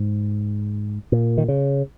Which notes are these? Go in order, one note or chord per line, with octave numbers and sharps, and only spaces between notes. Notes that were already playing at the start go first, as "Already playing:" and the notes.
Already playing: G#2
A#2
D#3
C#3